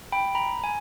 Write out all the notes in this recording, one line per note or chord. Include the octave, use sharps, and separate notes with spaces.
G5 B5
A#5 B5
G#5